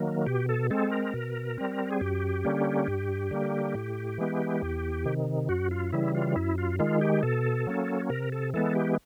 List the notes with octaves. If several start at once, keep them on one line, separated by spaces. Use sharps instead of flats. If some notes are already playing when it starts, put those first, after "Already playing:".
Already playing: D#3 F#3 A#3
B2 G4
A4
G#3 C4 A4
A#4
B2
G3 C4
G#4
F#2 G4
D3 G3 A#3 C#4
G2
D3 G3 A#3
A2
E3 G#3 B3
E2
C3 D#3
F#2 F#4
F4
C#3 E3 G3 E4
F4
F#2 E4
F4
D#3 G#3 F4
G4
B2 A4
F#3 A#3 C#4
C3 A#4
A4
E3 G#3 B3 A4
G4